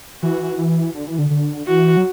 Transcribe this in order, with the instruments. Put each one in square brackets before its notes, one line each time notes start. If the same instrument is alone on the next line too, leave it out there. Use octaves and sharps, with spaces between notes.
[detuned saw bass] E3 [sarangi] F#4
[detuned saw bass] E3
D3
E3
D3
D3
[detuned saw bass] E3 [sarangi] F#4
[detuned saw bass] F#3